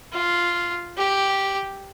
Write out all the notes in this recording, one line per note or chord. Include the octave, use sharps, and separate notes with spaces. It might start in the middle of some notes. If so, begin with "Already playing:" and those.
F4
G4